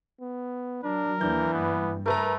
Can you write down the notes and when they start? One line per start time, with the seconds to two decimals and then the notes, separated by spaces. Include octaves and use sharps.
0.21 B3
0.83 F#3 D4 A#4
1.21 D#2 E3 A#3 D4 G6
1.53 G2 B3
2.06 A3 A#4 B4 A#5